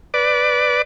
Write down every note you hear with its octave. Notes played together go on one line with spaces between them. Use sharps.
B4 D5 D6